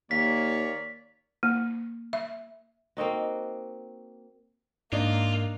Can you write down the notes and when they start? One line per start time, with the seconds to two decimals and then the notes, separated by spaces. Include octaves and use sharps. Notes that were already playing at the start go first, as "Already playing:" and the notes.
0.11 D#2 A#3 A#4 C#5 D5 B6
1.43 A#3
2.13 E5
2.97 A#3 C4 D#4 F#4
4.93 G#2 A#3 D4 D#4 F4